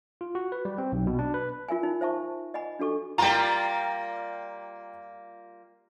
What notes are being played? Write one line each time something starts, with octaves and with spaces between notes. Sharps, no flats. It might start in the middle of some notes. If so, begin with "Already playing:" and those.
F4
F#4
B4
G3
C4
B1
B2
D4
B4
F4 A#4 E5 G#5
D#4
C5 E5 A5 C#6
D#5 F#5 G#5 B5
D4 F#4 A4 C#6
G3 A#3 F4 G5 A#5